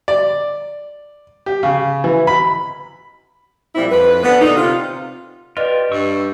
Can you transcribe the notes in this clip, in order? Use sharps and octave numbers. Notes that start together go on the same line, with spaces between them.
D5
G4
C#3
E3
B5
A#2 F3 G3 C4 E4
F2 B4
D3 B3
A#2 D3 D4 D#4
C3 F4
F4 G4 B4 D5 D#5
G2 G3 C#6 E6